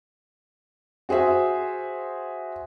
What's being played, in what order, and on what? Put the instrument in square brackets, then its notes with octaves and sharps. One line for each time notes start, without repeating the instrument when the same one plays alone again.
[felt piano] F#4 G#4 C5 E5